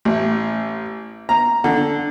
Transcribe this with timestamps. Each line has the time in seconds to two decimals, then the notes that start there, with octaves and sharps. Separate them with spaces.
0.05 A1
1.29 A#5
1.64 D3